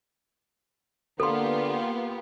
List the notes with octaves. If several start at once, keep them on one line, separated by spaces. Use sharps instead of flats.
D3 A#3 B3 F4 G4 A4 C6